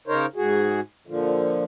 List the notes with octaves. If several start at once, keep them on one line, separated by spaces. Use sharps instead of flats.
C#3 D#4 A#4 C5 C#5
G#2 F#4 G#4
A#2 D3 F3